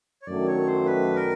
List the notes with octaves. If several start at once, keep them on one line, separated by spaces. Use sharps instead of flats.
C#5
F#2 D#3 F#3 A3 D4 D5
C#5
C5
B4
A#4